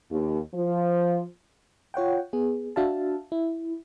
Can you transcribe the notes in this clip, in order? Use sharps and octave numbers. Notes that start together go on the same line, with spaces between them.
D#2
F3
F4 C#5 F#5 G5
B3 G#4
D4 F#4 E5 F5 A5
E4